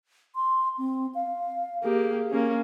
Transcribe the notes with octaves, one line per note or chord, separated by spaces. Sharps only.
C6
C4
F5
A#3 G4 G#4
A#3 C#4